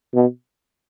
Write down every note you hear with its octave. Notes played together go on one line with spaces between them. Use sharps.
B2